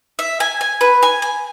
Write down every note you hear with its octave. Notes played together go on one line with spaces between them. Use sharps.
E5
G#5
G#5
B4
G#5
G#5